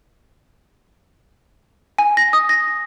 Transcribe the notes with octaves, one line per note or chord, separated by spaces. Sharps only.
G#5
A#6
D#6
A#6